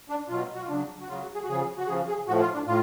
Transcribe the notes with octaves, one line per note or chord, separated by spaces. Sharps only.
D4
B2 F#3 F4
F#4
F4
C#3 F#3 D4
F#4
C#3 F#3 F4
F#4
G#4
F#4
C#3 F3 G#4
F#4
C#3 F3 G#4
G#4
A2 F3 F#4
F4
D4
A2 F4